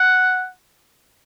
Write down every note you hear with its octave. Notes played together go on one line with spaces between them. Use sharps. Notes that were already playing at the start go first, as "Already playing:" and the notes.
Already playing: F#5